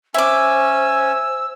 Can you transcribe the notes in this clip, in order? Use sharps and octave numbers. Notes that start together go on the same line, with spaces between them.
C#4 C5 E5 G#5 D6 E6